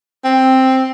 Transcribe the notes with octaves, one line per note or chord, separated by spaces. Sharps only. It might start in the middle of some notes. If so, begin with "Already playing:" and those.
C4